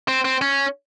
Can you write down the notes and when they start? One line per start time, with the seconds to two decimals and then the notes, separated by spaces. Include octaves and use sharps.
0.08 C4
0.25 C4
0.42 C#4